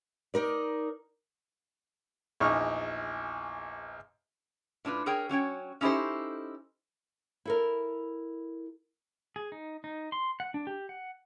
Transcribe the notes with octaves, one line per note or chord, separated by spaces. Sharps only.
D#4 A#4 D5
A#1 E2 D#4 C#6 F6
A2 D4 F4 B4
G#4 A#4 C#5 G5
F#3 C#4 C#5 G5
C#4 D#4 E4 G4 A4 C5
E4 A4 A#4
G#4
D#4
D#4
C6
F#5
D4
G4
F#5